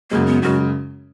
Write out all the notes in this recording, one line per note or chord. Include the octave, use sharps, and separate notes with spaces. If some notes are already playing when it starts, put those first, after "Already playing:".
F#2 C#3 G#3 A#3
B3
F#2 C#3 G#3 F#4